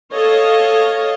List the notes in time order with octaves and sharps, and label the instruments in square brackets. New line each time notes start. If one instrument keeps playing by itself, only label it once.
[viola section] A4 C#5 D#5 F5